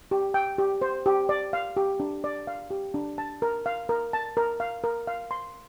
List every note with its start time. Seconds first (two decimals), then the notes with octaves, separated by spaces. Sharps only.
0.11 G4
0.34 G5
0.58 G4
0.82 C5
1.06 G4
1.29 D5
1.53 F5
1.77 G4
2.00 D4
2.24 D5
2.47 F5
2.71 G4
2.94 D4
3.18 A5
3.42 A#4
3.66 F5
3.89 A#4
4.13 A5
4.37 A#4
4.60 F5
4.84 A#4
5.07 F5
5.31 C6